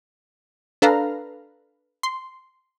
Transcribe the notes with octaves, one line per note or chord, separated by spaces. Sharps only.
D4 A4 B4 F5 A#5
C6